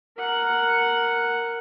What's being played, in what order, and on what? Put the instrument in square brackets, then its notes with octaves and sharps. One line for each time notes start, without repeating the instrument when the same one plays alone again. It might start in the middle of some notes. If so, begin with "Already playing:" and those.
[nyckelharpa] A#4 F#5